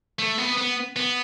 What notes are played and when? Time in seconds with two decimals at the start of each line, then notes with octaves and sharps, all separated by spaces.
0.19 A3
0.38 B3
0.57 B3
0.96 B3